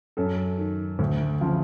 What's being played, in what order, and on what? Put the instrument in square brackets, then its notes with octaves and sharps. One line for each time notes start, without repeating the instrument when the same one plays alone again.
[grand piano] F#2 A4
D#3
D2
C#3 F3